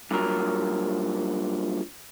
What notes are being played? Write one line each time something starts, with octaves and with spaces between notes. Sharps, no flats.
G2 A#2 F#3 A#4